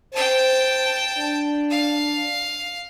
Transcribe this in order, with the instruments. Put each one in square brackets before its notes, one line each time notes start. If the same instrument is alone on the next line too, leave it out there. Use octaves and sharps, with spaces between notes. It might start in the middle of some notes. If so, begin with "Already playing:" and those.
[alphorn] C5 [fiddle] G5 A5
[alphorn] D4
[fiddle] F5